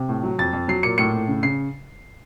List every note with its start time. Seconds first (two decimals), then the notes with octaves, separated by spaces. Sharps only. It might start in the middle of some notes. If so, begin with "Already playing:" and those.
Already playing: C3
0.09 A2
0.23 F#3
0.39 F2 A6
0.53 F2
0.68 F#3 C7
0.83 A#2 C#7
0.98 A2 C#7
1.13 A2
1.28 C#3
1.43 C#3 C7